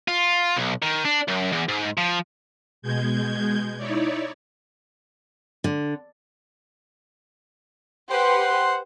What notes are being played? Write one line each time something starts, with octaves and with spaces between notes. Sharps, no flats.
F4
B1
D#3
D4
F#2
E2
G#2
F3
B2 G#3 G6 G#6
D#4 E4 C#5 D5
D3
G4 B4 C5 F#5 C6